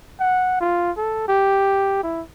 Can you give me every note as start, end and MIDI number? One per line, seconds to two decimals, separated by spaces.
0.20 0.56 78
0.61 0.91 65
0.97 1.25 69
1.28 2.02 67
2.04 2.21 64